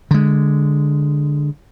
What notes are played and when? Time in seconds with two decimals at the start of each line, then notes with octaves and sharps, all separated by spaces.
0.11 D3 G#3